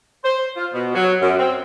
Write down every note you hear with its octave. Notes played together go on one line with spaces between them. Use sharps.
C5
F4
B2
F#3
F#2
C4